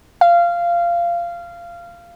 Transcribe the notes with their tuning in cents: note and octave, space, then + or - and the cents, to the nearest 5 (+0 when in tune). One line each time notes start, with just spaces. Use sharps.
F5 -15